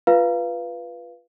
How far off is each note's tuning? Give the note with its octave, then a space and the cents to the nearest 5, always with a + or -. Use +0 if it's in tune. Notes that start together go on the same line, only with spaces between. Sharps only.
F4 +0 B4 -5 F5 -15